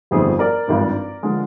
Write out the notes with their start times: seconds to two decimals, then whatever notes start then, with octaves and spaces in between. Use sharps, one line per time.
0.11 G1 F2 D#3 G3 G#4 C5
0.39 A#4 D5
0.67 G#1 G2 F3
1.23 D3 F3 G#3